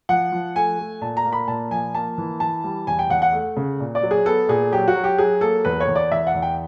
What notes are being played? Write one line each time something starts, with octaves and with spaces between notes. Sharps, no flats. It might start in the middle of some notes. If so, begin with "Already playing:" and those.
F3 F#5
F3
A3 G#5
A3
A#2 A5
A#5
A#3
B5
A#2 A5
F3 G#5
A#3 A5
E3
E3 A5
G3
E2 G#5
G5
E2 F#5
F#5
A3
C#3
A#2
D5
F#3
G#4
B3 A4
A#2 G#4
F#3 G4
F#4
F#3
G4
F#3 G#4
A#3 A4
E2 B4
C#5
E2
D5
E2 E5
F#5
E2
G5